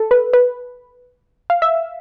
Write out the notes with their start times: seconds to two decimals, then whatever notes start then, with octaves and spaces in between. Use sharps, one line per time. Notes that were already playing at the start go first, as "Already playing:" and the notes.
Already playing: A4
0.11 B4
0.33 B4
1.50 F5
1.62 E5